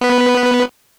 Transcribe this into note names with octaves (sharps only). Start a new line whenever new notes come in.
B3 B4